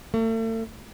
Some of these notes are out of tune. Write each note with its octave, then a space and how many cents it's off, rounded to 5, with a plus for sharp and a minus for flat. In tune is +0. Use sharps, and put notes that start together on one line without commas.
A3 +40